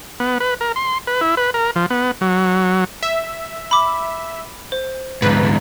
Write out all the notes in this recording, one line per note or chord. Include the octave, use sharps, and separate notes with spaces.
B3
B4
A#4
C6
B4
E4
B4
A#4
F3
B3
F#3
E5
B5 D6
C5
D2 G#2 B4